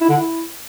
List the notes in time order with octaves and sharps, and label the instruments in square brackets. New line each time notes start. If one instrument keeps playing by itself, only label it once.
[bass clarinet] E4
D3
E4